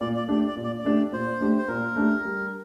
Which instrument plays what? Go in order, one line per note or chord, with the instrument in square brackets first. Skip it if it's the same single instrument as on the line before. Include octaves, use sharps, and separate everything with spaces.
[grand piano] A#2 [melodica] D5
[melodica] D5
[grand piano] A3 D4 G4 [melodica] D5
[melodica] D5
[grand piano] A#2
[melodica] D5
D5
[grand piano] A3 D4 G4
[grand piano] A#2 [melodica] C5
[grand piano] A3 D4 G4
[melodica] C5
[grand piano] A#2 [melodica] A#4
[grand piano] A3 D4 G4
G3